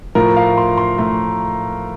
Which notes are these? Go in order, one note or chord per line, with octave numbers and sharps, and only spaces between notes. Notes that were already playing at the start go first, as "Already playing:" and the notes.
A2 F3 A3 A#4
F5
C6
C6
A2 F3 A3 A#5